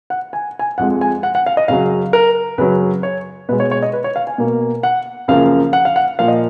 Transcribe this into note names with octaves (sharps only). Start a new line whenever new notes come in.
F#5
G#5
G#5
F2 F3 G#3 F#5
G#5
F#5
F#5
F5
D#5
F#2 C#3 F#3 F5
A#4
F#2 C#3 F#3 B4
C#5
B2 G#3 B4
C#5
C#5
D#5
B4
C#5
F5
G#5
B2 A#3
F#5
F#2 C#3 F3 A#3 F5
F#5
F5
F#5
A#2 F3 A#3 F5
D#5